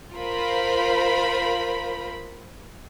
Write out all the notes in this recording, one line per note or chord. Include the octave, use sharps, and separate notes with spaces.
F4 A#4 C5 B5